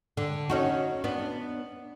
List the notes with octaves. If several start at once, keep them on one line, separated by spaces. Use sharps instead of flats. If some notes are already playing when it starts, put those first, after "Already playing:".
D3
C#4 D#4 F#4
B3 D4